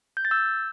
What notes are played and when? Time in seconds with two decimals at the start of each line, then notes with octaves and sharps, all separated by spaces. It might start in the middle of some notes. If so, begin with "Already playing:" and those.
0.17 G6
0.25 A6
0.31 E6 G6